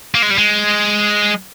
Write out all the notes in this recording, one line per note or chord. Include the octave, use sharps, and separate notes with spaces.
A#3
G#3
G3
G#3